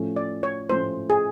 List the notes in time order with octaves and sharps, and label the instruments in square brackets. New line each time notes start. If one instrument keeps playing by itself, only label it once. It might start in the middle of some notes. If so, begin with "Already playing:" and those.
Already playing: [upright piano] A2 F3 A3 C#4
[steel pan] D5
C#5
[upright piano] A2 F3 A3 C#4 [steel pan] C5
[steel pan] G#4